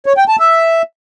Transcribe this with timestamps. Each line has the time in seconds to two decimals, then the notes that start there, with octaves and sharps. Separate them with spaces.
0.06 C#5
0.17 G5
0.28 A5
0.39 E5